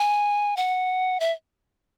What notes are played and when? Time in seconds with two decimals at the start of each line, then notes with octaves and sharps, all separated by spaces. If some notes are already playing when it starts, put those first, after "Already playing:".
Already playing: G#5
0.57 F#5
1.20 E5